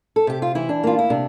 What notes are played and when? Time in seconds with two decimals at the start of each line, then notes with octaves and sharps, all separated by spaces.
0.16 A4
0.27 C3 G4
0.42 F4
0.55 E3 E4
0.69 D4
0.83 A#3 F4
0.99 E4
1.10 C3 D4